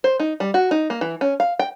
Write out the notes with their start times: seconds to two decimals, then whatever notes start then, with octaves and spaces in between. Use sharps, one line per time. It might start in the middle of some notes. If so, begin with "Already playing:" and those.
0.04 C5
0.20 D#4
0.40 G3
0.54 F#4
0.71 D#4
0.90 A#3
1.01 E3
1.21 C#4
1.40 F5
1.59 G5